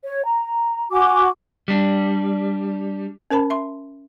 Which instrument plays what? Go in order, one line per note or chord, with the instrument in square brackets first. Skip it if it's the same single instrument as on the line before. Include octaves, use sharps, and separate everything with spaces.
[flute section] C#5
A#5
F#4 G#5 D6
[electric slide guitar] G3 D4
[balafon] C#4 A#4 C5 A5 B5
E5 C6 C#6